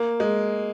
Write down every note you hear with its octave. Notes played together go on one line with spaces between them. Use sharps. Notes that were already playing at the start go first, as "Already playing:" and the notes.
Already playing: A#3
G#3